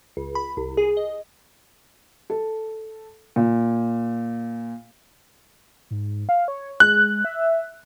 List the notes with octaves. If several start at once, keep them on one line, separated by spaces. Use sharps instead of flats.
C#2
B5
C2
G#4
D#5
A4
A#2
G#2
F5
C#5
G#3 F#6
E5